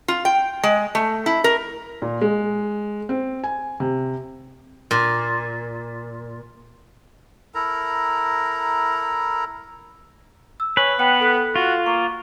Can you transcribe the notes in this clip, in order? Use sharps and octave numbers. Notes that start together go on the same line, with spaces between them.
F4
G5
G#3
A3
E4
A#4
A#2
G#3
C4
G#5
C3
A#2
E4 A4 A#4 A#5
E6
B4 C#5 G#5
B3 G5 F#6 C#7
A4 F#6
F4 F#4
A#3 C#6